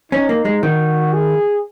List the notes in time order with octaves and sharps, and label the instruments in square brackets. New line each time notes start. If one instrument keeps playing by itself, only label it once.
[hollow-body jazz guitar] C#4 [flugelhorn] D#4
[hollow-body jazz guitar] A#3
G#3
[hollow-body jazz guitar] D#3 [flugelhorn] F#4
[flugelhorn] G#4